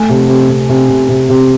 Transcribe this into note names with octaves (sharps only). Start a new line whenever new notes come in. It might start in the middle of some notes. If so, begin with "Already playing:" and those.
Already playing: A3 G#5
C3
C3
C3
C3
C3
C3
C3